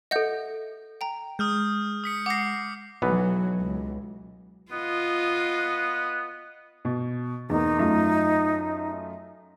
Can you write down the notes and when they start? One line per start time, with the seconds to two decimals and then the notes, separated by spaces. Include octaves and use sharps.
0.11 A4 D#5 E5 F#5 G6
1.01 G5 A#5
1.39 G#3 D#6 F6 G6
2.04 D#6 B6 C#7
2.26 F#5 D6 A#6 C7
3.02 B1 E3 F#3 B3
3.59 C#2
4.72 B3 F4 D#5
6.85 B2
7.50 E2 A#3 D#4
7.78 F#2 A3 F4